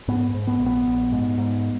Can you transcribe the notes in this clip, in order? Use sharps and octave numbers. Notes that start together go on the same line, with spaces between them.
G#2 B3
G#2
B3
A#1
B3
A#1
G#2
G#2